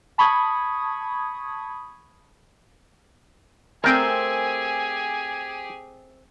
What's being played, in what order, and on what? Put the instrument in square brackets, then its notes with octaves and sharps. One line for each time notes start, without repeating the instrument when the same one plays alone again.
[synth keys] A5 B5 C#6 D#6 G#6
[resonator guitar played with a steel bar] A3 C4 C5 [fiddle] G4 G#4 [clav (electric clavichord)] A#4 G5 [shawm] G#5